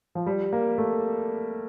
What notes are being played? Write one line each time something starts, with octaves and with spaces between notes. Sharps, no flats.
F3
G3
A#3
A3